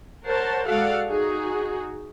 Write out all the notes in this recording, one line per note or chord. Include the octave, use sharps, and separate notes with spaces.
A#4 C5 C#5 F#5 A5
G#3 F#4 A4 D5 F5 F#5
D#4 F#4 G#4